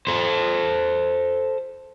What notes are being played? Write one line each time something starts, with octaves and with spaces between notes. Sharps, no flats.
A4 C5